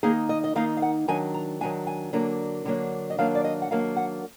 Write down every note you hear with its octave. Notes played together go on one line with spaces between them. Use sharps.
D#3 A#3 D#4 G#4
D#5
D#5
D#3 A#3 D#4 F5
F5
F#5
D#3 F#3 D4 G#5
A#5
D#3 F#3 D4 G#5
G#5
D3 F#3 A#3 D4
D3 F#3 A#3 D4
D#5
D#3 F#3 A#3 D4 F5
D5
D#5
F#5
D#3 F#3 A#3 D4 F5
F#5